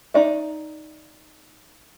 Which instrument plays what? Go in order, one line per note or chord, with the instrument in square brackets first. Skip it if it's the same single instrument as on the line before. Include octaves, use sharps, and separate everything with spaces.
[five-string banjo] D#4 D5 E5